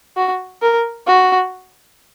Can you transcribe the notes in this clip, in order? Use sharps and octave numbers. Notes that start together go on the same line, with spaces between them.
F#4
A#4
F#4